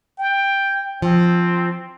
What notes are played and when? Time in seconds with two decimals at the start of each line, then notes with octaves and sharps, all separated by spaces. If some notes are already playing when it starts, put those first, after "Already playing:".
0.19 G5
1.02 F3 C4